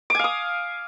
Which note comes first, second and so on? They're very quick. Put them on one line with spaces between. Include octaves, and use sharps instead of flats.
D6 G#5 F5 D#6